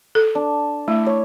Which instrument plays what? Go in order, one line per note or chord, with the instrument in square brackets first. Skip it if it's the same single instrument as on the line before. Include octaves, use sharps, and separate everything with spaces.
[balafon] A4
[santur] D4
[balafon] A3 [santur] E4
[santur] C#5